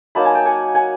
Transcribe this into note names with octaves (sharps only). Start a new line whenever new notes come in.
F#3 A#3 D#4 A5 B5
G#5 A#5
G5 A5
F#5 G#5
F#5 G#5